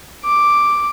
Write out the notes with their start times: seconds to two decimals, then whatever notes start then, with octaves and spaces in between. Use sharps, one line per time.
0.24 D6